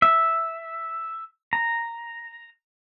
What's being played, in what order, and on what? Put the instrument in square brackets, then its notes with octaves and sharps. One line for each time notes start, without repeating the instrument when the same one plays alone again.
[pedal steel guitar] E5
A#5